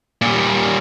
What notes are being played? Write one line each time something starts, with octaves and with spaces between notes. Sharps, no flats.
A#2 G3